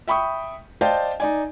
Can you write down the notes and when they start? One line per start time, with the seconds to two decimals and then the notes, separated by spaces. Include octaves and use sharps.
0.08 E5 G5 B5 C#6 D#6
0.81 C5 D5 D#5 F5 G5 A5
1.20 D#4 D5 G#5